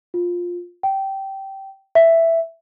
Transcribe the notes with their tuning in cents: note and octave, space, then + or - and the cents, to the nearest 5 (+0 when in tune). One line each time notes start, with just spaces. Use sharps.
F4 +10
G5 -15
E5 +5